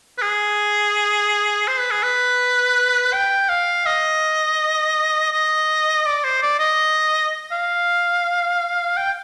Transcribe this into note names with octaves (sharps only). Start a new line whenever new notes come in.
B4
G#4
C5
B4
G#4
B4
G5
F5
D#5
D#5
D5
C5
D5
D#5
F5
G5